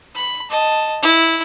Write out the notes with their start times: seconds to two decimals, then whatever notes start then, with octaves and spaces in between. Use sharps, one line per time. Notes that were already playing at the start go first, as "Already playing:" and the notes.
0.15 B5
0.50 D#5 A5
1.02 E4